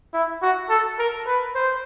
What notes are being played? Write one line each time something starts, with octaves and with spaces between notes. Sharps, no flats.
E4
F#4
A4
A#4
B4
C5